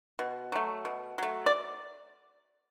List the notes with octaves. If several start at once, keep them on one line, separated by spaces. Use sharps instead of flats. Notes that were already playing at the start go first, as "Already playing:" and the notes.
B2
F#3 A3
B2
F#3 A3
D5